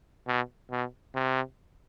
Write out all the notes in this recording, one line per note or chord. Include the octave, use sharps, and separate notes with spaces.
B2
B2
C3